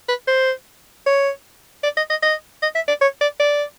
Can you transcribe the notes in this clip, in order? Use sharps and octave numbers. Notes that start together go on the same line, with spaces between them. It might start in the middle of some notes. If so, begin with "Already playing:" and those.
B4
C5
C#5
D5
D#5
D#5
D#5
D#5
E5
D5
C#5
D5
D5